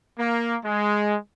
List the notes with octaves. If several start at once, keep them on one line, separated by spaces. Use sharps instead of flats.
A#3
G#3